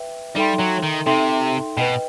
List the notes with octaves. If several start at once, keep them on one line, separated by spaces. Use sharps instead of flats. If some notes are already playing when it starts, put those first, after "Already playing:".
Already playing: B4 E5 G5
G3 D#4 A4 E5 G5 C6
F#3
D#3
C3 D#4 A4 E5 G5 C6
B2 B4 D#5 G5